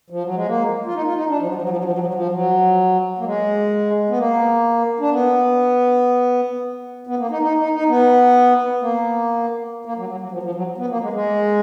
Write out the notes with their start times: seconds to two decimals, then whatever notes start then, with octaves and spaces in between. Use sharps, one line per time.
0.10 F3
0.23 F#3
0.35 G#3
0.47 A#3
0.86 F4
0.94 D#4
1.05 F4
1.16 D#4
1.29 D4
1.40 F3
1.47 F#3
1.55 F3
1.62 F#3
1.69 F3
1.76 F#3
1.84 F3
1.92 F#3
1.99 F3
2.06 F#3
2.14 F3
2.33 F#3
3.19 A#3
3.25 G#3
4.09 B3
4.18 A#3
5.00 D4
5.11 B3
7.07 B3
7.19 A#3
7.30 D#4
7.42 D#4
7.58 D#4
7.73 D#4
7.89 B3
8.81 A#3
9.85 A#3
9.97 F#3
10.09 F#3
10.20 F#3
10.32 F3
10.43 F3
10.55 F#3
10.78 B3
10.90 A#3
11.01 G#3
11.13 G#3